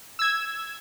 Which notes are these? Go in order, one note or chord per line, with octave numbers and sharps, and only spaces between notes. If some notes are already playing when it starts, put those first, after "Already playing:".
E6 G#6